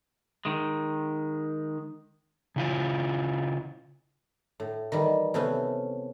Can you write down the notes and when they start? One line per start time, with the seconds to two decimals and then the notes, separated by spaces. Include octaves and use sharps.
0.45 D#3 G#3
2.56 C#3 E4 F4
4.60 A2
4.92 D#3 E3 G3
5.34 C3 A3 B3 C#4